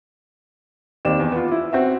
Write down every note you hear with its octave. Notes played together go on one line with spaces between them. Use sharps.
D#2 C4 G4 D5 E7
E2
B3 F4
E4
C4 F#4 E5